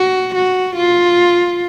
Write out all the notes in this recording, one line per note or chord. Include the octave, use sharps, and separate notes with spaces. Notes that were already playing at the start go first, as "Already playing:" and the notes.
Already playing: F#4
F#4
F4